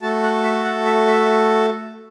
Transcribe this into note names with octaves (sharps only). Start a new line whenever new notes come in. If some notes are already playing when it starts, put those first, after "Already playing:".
A3 F#4 A4 A5
F#5
E5
F#5
E5
E5